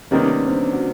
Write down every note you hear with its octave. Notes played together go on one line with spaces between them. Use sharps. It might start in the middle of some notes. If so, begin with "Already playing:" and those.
C3 D#3 G3 A#3 B3 C#4 D#4
C4 D4
F#4